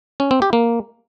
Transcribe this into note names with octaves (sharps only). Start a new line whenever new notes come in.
C#4
C4
G4
A#3